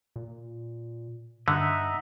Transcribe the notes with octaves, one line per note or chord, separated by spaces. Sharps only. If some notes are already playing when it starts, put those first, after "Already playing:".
A#2
G2 D3 D#4 E5 F#5